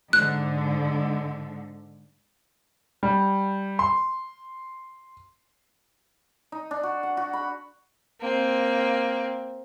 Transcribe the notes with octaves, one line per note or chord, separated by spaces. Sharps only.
G#2 D3 F#6
G3
C6
D#4
D4
F#4
F#5
F#4
B5
A#3 C4